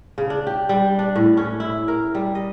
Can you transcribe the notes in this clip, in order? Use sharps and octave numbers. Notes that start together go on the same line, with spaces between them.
C#3
D4
G4
G3
D4
A2
C#4
E4
A#4
G3
D#5